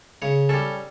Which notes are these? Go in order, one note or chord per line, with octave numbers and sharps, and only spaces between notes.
C#3 C#5
G3 C#4 A4